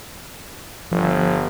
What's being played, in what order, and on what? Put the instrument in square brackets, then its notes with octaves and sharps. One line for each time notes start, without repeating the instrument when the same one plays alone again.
[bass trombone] G1 [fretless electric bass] F3